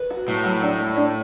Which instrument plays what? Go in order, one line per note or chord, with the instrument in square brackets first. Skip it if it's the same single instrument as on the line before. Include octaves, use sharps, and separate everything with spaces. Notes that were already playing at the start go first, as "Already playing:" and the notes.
Already playing: [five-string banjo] B4
F#4
[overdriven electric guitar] A2 [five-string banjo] F#3
[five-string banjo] F#3
D4
A3
D4